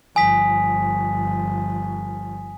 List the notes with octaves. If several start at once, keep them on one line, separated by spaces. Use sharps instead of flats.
G1 F3 G#5 D#6 B6